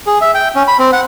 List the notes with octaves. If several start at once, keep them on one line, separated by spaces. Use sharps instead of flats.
G#4
E5
G5
C#4
B5
C4
F#5